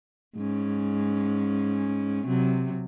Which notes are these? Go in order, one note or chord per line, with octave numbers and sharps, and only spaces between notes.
G#2 C#4
C3 F#3